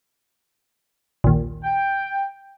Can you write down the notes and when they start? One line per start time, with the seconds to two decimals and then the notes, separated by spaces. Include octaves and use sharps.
1.24 A#1 D#2
1.63 G5